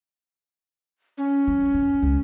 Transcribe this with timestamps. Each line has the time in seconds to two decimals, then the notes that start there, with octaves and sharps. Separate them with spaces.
1.18 C#4
1.48 F#3
1.74 F2 E3
2.02 C#2